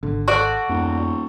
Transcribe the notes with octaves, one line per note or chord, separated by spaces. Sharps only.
G#1 D3
F#4 A4 C5 D5 C#6
D#1 F2 B3